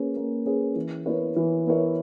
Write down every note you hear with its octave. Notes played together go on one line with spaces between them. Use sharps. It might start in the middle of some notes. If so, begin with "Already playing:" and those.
Already playing: A#3 C#4 G#4 B4
A#3
C#4 G#4 B4
E3
B3 E4 A#4 C#5
E3
B3 E4 A#4 C#5